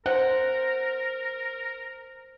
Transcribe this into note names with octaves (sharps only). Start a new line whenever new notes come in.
A#4 C5 F#5